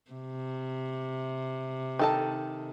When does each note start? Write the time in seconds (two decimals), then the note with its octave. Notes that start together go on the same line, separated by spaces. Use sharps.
0.11 C3
1.99 D#3 A4 A5